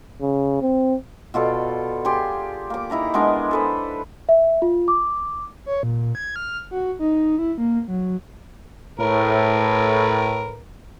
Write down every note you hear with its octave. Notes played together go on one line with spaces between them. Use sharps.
C#3
C4
B2 F4 A4 D5
G4 G#4 C6
A#3 D6
D#4 E4 A#5 D6
G#3 B3 D4 A#4
A4 B4 C5
E5
F4
D6
C#5
A#2
G#6
F6
F#4
D#4
E4
A#3
F#3
A2 A#4 B4